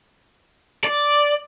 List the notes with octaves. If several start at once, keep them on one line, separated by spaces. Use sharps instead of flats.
D5